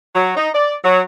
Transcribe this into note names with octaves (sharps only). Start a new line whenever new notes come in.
F#3
D#4
D5
F#3